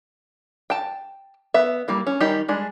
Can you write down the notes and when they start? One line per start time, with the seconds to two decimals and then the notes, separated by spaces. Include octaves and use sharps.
0.70 G5 A5
1.54 B3 E5
1.88 G3 A#3 E4
2.07 C#4
2.20 D#3 G3 D#4 G4
2.48 G3 G#3 D4